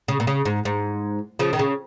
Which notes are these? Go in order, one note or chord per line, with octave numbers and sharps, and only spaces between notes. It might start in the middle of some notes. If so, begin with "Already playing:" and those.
C#3
A#2
C#3
G#2
G#2
C#3 F3
D#3
C#3